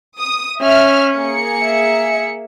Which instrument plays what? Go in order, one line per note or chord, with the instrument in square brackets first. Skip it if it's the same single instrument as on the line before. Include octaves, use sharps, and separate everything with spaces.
[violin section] D#6
[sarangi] C#4 [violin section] E5 F6
[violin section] A#3 G#4 C#7
[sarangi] E5